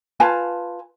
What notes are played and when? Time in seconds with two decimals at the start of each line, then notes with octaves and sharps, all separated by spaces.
0.20 F4 B4 G#5 A5